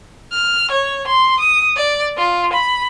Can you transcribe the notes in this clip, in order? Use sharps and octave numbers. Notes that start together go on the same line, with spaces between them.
F6
C#5
C6
D#6
D5
F4
B5